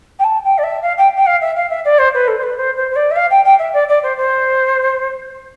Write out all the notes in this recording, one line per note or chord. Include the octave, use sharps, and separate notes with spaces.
G5
A5
G5
D5
E5
F5
G5
G5
F5
E5
F5
E5
D5
C5
B4
A4
C5
B4
C5
C5
C5
D5
E5
F5
G5
G5
E5
D5
D5
C5
C5